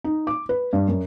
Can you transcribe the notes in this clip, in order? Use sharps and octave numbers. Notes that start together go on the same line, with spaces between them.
D#4
D6
B4
G2
F#2